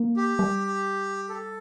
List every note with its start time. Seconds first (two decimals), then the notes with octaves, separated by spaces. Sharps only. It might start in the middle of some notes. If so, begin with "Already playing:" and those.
Already playing: A#3
0.17 G4
0.39 G3
1.29 A4